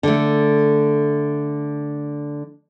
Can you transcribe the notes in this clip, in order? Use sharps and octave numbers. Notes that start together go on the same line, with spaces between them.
D3 A3